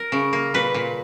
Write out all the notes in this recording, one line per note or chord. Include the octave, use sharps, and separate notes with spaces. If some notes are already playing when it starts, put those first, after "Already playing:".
Already playing: A#4
C#3
A#3
A#2 B4
A#2